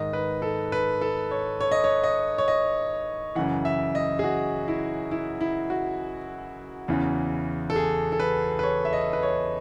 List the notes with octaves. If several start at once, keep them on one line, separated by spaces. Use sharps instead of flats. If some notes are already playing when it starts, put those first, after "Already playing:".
Already playing: G#2 D#3 D#5
B4
A4
B4
A4
C#5
C#5
D#5
C#5
D#5
C#5
D#5
F#2 C#3 E3 F#5
E5
D#5
G#4
F#4
E4
E4
E4
F#4
E2 C#3 E3
A4
G#4
A4
B4
B4
C#5
E5
D#5
B4
C#5